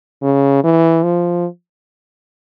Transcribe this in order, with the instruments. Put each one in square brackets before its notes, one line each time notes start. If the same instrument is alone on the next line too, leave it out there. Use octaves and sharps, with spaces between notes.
[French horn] C#3
E3
F3